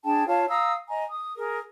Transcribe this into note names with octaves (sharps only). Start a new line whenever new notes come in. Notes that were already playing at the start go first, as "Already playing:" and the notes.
D4 G#4 G5 A5
F4 C#5 F5 A5
F5 A#5 D#6 E6
D#5 G#5 A#5
D#6
G#4 A#4